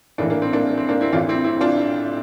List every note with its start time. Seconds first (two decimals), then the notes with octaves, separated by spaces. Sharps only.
0.18 A#1 A2 E3 A#3 D4
0.30 A#3 D4
0.42 C4
0.53 A#3 D4
0.65 A#3
0.77 C4
0.89 A#3 D4
1.01 C4 E4
1.12 A1 A2 E3 D4 F4
1.29 C4 E4
1.44 C4 E4
1.60 D4 F4